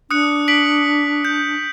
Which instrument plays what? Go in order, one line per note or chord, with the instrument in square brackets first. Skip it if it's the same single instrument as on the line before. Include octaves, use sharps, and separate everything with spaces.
[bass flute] D4 [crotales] D#6 F#6 C#7
[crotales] B6 D7 F#7
G6